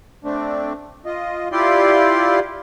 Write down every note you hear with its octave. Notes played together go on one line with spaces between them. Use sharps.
A3 C4 D4
F4 D#5
E4 F4 G4 D5 C6